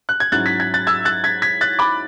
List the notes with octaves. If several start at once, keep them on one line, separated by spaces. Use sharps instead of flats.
F#6
G#6
G#2 F#3 C#4 E4 F#6 A6
G#6 B6
G#6 B6
F#6 A6
E6 G#6
F#6 A6
G#6 B6
G#6 B6
F#6 A6
B5 D6